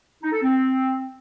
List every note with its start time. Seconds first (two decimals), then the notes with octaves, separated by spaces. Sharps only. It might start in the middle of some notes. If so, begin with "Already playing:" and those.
0.22 D#4
0.32 A4
0.43 C4